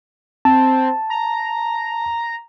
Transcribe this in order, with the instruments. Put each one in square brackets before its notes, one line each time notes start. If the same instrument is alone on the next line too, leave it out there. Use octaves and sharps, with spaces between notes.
[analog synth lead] C4 [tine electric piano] A5
[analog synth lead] A#5